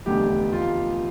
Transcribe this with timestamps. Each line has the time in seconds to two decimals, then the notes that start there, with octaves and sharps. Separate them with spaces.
0.06 F1 E2 D3 A3 G4
0.53 F4